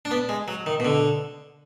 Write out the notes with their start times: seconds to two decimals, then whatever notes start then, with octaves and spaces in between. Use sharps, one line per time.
0.05 D4
0.11 B3
0.29 G#3
0.48 F#3
0.66 D#3
0.80 B2
0.85 D3